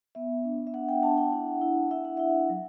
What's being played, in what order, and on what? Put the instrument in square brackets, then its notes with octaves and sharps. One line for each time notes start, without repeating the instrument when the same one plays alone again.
[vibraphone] B3 E5
D4
E5
D4 F#5
G5
D4 A5
G5
E4 F#5
E4
E4 E5
F#5
E4 E5
F#3